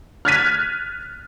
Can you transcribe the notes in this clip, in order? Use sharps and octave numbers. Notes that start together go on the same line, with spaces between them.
F6 F#6 G#6 A6 B6 D#7